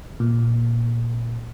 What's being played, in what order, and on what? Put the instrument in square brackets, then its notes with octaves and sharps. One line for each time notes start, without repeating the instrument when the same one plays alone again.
[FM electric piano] A#2